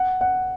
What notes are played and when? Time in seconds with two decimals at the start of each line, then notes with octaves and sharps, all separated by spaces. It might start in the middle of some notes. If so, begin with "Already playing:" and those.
Already playing: F#5
0.21 F#5